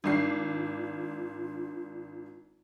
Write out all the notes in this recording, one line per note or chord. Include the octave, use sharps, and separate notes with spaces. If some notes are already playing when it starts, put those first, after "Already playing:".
G#1 D4 F4 C7